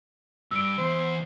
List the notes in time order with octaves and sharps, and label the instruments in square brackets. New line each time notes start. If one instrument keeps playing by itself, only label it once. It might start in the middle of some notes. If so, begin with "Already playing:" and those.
[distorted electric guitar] G2 [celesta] E6 D7
[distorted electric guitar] E2 [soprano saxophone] C5